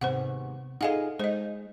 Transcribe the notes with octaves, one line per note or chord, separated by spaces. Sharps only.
D#2 G#2 C3 B3 C5 F#5
D#4 F4 G#4 A4 D#5 F5 F#5
G#3 D#4 C5 D#5